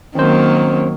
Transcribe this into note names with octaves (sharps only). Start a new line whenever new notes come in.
D#3 F#3 A#3 C4 C#4 C5